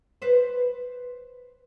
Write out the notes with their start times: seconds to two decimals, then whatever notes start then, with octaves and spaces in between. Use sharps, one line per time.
0.22 B4 C5